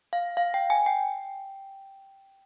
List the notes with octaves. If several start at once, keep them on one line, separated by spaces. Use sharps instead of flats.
F5
F5
G5
G#5
G5